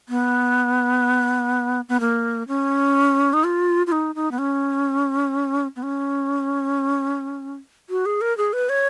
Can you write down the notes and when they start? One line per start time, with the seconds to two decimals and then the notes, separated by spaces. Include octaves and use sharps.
0.09 B3
1.89 B3
2.00 A#3
2.48 C#4
3.33 D#4
3.44 F4
3.87 F4
3.92 D#4
4.15 D#4
4.31 B3
4.39 C#4
5.76 B3
5.83 C#4
7.90 F#4
8.06 G#4
8.21 A#4
8.38 G#4
8.53 B4
8.69 C#5